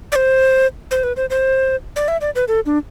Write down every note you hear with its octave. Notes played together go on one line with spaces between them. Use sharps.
D5
C5
C5
B4
C5
C5
D5
E5
D5
B4
A4
D4